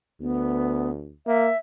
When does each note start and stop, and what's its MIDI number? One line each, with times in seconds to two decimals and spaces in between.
0.21 1.14 38
0.21 0.91 59
1.27 1.49 58
1.27 1.57 76